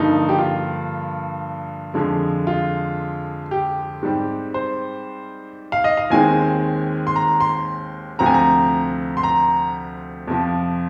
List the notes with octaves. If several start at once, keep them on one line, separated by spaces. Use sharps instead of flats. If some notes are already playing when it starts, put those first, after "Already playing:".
Already playing: G2 D3 F3 A#3 D#4
G4
F4
F2 D3 F3 G#3
F4
G4
G#2 G3 C4
C5
F5
D#5
F5
D#2 D#3 G#3 C4 G#5
C6
A#5
C6
D2 C3 F3 C4 A#5
G#5
A#5
C6
A#5
F2 C3 F3